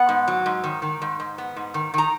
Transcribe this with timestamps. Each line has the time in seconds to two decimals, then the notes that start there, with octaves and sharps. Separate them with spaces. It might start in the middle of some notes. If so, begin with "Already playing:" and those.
Already playing: B3 F#5
0.09 G#2
0.28 F#3
0.46 G#2
0.64 D#3
0.82 D#3
1.02 G#2
1.20 G#2
1.38 B3
1.56 G#2
1.74 D#3
1.94 D#3 A#5